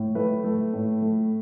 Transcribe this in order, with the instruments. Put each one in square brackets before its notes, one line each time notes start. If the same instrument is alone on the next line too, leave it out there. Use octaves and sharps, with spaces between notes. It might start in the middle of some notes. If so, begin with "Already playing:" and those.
Already playing: [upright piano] A2
A3 B4
A3
A2
A3